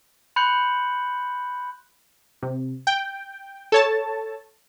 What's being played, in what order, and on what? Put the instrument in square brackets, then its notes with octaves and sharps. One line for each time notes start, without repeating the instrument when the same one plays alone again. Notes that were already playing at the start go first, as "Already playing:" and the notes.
[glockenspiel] B5 C6 F#6 G6 C#7 F#7
[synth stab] C3
G5
A4 C#5 A5